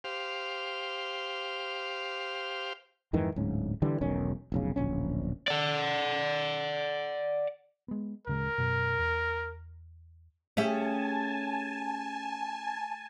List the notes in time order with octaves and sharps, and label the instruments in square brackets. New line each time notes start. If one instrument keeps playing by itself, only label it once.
[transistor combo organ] G4 C5 F5
[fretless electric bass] F2 G#2 D#3 E3
D1 G#2 C#4
D3 E3 G3
E1 B1 D#3 C#4
F1 B1 C#3
D1 A#1 C#4
[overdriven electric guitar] D5 F#5
[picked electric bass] G#3 B3
[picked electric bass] D1 C#3 G#3 [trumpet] A#4
[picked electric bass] F#2 B2
E2
[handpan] A3 G#4 [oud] C#4 G4 E5 [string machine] G#5 A5